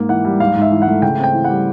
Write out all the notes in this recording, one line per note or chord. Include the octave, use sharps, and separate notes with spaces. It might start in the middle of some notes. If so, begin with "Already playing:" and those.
Already playing: G#2 A#3
E3 F#5
G3
G#2 F5
G#2
E5
E3
F#5
A3
C#3 G5
C4
G5
E3
G3 F#5